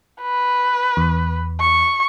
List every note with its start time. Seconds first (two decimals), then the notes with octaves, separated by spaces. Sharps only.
0.21 B4
0.97 E2
1.60 C#6